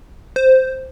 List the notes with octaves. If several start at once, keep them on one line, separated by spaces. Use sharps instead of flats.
C5